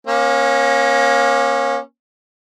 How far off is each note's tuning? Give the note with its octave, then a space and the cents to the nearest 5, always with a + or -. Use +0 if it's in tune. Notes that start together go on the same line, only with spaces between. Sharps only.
A#3 +25 C#4 -20